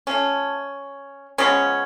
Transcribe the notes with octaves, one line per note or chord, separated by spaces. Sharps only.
F3 A3 C#4
C#3 F3 G#3 B3 C#4